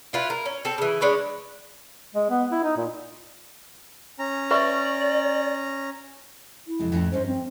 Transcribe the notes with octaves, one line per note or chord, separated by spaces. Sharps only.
E4 F4 B4
A#4
C#4
C4 A4
C#3 E3
G#3 D4 B4 C#5
G#3
B3
E4
D#4
A#2
C#4 A#5
B4 D5 E5 C#6
E4
F2 C3 G#3
F2 A2 C#4
G2 C#4 D#4 C5
C4